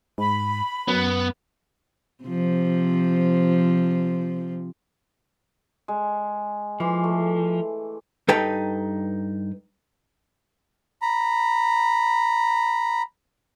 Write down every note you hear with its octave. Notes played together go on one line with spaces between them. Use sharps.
G#2 B5
F#2 B3
C3 F3
G#3
E3 F3 C6 D6
A3
G2 D#4 A4 B4 G5 A#5
A#5 B5